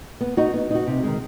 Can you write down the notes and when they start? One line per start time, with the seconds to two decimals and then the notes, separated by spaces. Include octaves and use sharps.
0.21 B3
0.37 D#4 F#4
0.54 B3
0.70 D#4 F#4
0.87 C3
1.03 D#3 G#3